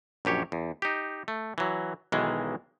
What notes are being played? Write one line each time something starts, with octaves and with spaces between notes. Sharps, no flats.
A#1 F#2 G4 C#5
E2
D#4 G4
A3
E3 F#3
B1 D#3 E3 G#3